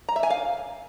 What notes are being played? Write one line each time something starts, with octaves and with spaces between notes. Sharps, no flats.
A#5
E5
G#5
F5